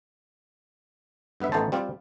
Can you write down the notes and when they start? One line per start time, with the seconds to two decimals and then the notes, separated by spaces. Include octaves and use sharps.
1.40 G2 B3 B4 E5
1.52 A1 A3 B3 D#4 C5 A5
1.72 G3 C4 F4